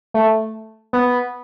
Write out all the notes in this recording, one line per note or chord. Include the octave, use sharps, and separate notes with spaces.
A3
B3